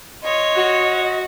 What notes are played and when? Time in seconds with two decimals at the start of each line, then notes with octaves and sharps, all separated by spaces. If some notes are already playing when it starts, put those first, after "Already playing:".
0.23 F4 C#5 D#5
0.56 F#4